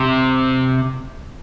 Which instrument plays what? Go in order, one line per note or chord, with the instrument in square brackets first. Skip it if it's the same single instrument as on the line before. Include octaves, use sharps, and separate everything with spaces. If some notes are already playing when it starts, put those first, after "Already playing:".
Already playing: [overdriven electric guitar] C3